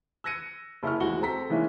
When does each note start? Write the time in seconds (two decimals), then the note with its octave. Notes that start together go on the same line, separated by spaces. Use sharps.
0.24 E6 F#6 G#6 A#6 C#7 D#7
0.83 F#1 E4 C#6 F6
1.00 D#2 E3 G#3 F#4 F#5 G7
1.21 C4 A4 A#5 B6
1.49 D#3 E3 G#3 A#3 C#4 E4